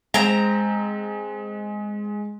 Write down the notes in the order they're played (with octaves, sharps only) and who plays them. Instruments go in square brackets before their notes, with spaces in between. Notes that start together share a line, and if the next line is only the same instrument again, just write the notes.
[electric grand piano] G#3 [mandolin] C4 A#5